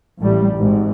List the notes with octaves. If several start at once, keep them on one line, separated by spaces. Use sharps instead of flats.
A1 A2 G3
G#1 G#2